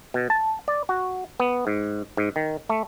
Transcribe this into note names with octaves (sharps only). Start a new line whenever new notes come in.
B2
A5
D5
F#4
B3
G#2
G#2
D#3
A3